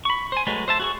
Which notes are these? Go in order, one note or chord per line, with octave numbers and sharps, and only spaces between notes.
B5 C#6
C5 G#5
F#3 G#3 A3 B4
C5 E5 A5
F#4 G#4 C#6